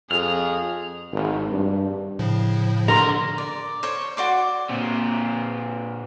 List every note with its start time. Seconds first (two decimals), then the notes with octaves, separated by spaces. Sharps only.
0.11 F2 G#4 F6
1.12 G#1
1.51 G2
2.19 A2 C#3 F3
2.88 D3 A#4 C6
3.38 D5
3.83 C5 C#5
4.17 F#4 D5 C6 D6
4.69 A#2 C4